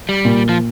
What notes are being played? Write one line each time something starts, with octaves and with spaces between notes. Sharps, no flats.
G3
A#2
F3